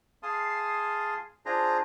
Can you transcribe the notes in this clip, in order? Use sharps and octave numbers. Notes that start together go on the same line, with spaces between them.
G#4 F5 A5 C6 D#6
D4 F4 G#4 C5 A#5